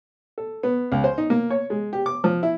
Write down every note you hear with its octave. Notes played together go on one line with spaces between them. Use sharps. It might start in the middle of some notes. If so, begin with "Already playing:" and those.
A4
B3
C#2
C5
D#4
A#3
C#5
G#3
G4
D6
F3
E4